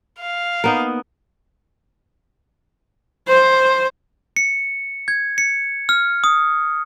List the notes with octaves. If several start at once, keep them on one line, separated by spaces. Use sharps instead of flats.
F5
A#3 B3 D#4
C5
C#7
G#6
C#7
F6
D#6